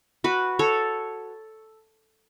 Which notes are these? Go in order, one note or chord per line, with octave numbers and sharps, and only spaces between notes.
F#4 B4
A4 C#5